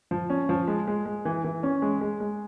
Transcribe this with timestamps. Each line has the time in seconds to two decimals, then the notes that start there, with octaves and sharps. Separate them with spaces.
0.11 F3
0.30 C#4
0.49 F3
0.68 G#3
0.87 G#3
1.06 G#3
1.25 E3
1.44 E3
1.63 C#4
1.82 G#3
2.01 G#3
2.20 G#3